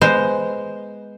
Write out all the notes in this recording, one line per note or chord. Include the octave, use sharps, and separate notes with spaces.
G#3 B3 C5